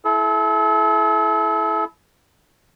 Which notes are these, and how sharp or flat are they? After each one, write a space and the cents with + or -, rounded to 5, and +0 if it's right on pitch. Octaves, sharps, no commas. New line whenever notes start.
E4 +5 A4 -40